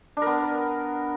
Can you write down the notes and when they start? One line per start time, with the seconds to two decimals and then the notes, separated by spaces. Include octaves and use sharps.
0.17 D4
0.22 A#4
0.26 B3